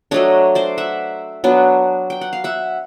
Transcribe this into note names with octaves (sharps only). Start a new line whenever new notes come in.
F#3 A3 D4 C#5 D#5
C5 D5
E5 F#5
F#3 B3 D4
G5
F#5
F5
E5 F#5